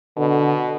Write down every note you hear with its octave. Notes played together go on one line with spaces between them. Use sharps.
B2 D3